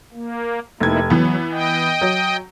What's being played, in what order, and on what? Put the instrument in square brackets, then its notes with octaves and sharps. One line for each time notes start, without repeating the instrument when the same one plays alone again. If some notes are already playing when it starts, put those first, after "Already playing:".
[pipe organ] A#3
[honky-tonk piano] F1 G#6 [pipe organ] A#3 D#4 E4
[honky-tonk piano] E3 B3 [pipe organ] F#3
[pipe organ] D#5 G5
[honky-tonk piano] F#3